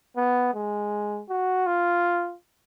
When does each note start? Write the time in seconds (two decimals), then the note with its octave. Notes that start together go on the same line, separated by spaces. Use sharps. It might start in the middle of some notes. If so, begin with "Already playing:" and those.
0.17 B3
0.54 G#3
1.30 F#4
1.67 F4